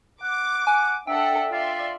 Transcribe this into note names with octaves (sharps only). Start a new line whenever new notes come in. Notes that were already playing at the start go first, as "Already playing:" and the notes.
F#5 D6
F#5 G#5
D4 A4 E5 F#5 G5
F4 D5 E5 C6